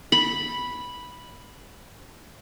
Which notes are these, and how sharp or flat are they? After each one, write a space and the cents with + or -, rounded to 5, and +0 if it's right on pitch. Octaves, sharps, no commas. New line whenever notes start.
B5 -5